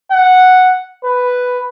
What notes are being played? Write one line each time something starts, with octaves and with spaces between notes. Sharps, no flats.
F#5
B4